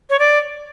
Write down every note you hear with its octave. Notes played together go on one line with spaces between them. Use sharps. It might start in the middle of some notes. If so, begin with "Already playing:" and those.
C#5
D5